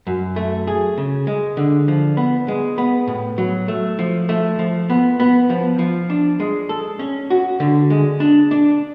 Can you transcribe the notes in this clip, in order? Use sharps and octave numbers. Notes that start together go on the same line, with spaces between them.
F#2
A3
G#4
C#3
G#3
D3
F3
B3
G#3
B3
A2
F#3
A3
F3
A3
F3
B3
B3
F3
F3
D4
G#3
A4
C#4
F#4
D3
G#3
D4
D4